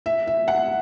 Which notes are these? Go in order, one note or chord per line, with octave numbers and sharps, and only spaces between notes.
E5
E5
F#5